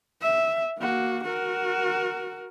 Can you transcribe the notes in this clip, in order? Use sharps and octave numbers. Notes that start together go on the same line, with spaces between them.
E5
A#3 F#4
F#4 A#4